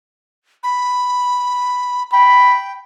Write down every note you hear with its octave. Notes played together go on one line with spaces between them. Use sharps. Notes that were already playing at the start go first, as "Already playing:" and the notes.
B5
G5 B5